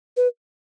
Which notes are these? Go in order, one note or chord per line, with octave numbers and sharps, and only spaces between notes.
B4